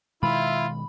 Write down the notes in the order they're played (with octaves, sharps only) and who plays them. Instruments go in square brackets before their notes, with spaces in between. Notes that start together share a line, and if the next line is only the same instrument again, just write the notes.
[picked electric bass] B2 D#3 G#3 [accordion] E4 [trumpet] F4 [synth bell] B5